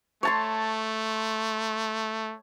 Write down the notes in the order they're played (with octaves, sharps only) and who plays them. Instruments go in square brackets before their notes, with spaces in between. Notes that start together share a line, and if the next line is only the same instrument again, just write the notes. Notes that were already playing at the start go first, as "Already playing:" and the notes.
[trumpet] A3 [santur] C#5 A5 C6